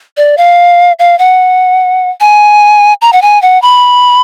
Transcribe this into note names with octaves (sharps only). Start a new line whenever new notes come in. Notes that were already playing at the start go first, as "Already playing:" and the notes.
D5
F5
F5
F#5
G#5
A#5
F#5
G#5
F#5
B5